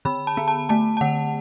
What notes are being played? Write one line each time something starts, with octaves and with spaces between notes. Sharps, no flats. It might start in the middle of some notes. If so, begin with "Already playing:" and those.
D3 B5
A5
B3
A5
A3 A5
A5
D3 F#5